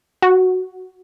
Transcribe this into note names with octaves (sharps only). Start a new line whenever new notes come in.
F#4